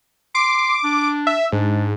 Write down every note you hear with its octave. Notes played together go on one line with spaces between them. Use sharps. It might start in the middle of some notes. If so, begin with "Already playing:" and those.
C6 D6
D4
E5
G#2 D4